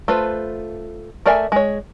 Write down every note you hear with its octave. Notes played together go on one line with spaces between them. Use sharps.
A3 F4 B4 C5
A3 A#4 D5 E5 G#5
G#3 C#5